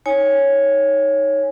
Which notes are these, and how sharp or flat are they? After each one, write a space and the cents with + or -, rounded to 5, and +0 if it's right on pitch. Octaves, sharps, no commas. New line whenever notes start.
D#4 +15 C#5 -5 G#5 +0